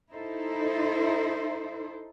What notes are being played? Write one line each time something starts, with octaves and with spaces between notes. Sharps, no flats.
D#4 E4 A4 C5